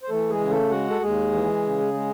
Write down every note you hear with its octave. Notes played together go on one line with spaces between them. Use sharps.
C5
E3 A3 A4
G#3 G#4
C#3
A3 A4
G#3 F#4 F#5
A4
D#2 G#3 G#4
E3
C#3
G#3